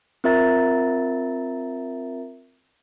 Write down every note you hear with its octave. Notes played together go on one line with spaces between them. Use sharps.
C4 F4 A#4 E5 A#5 A6